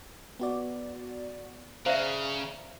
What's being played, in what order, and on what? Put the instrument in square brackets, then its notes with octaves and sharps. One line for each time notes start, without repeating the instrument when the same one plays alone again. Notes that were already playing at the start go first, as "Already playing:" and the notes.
[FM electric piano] B3 F#4 D5
[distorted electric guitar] C#3 [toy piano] C5 D5 E5 [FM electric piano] F5 A#5